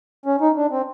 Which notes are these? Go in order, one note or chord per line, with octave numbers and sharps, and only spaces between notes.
C#4
D#4
D4
C4